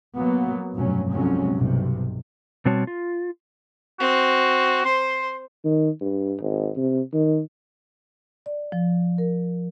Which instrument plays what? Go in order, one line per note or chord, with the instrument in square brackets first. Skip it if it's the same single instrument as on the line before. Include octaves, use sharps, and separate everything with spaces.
[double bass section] F#3 A#3 B3
F1 G2 B2 F#3 C#4
C2 F2 C3 F#3 G#3 C#4
B1 G2 C3
[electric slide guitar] B2 G3 C4 F#4 C#5 A5
F4
[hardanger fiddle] C4 [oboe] F#4
[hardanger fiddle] C5 [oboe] C6
[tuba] D#3
G2
G#1
C3
D#3
[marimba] D5
F3
A#4